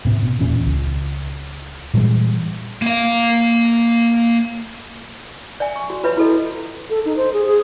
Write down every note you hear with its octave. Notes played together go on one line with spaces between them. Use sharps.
A2 C3
B2
D#1 E2 A#2 C#4
C#2
A#2 E3 G3 G#3
A#3 F5
D5 E5 G#5
C#6
F#4
F4 B4 C#5 E5 B5
E4 F#4 A4 D#5
A4
D#4
C5
G#4
G#4